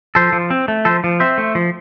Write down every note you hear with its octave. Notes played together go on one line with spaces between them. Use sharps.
F3 A4 C5
F3
C4
A3
F3 A4 C5
F3
C4 C5 E5
A3
F3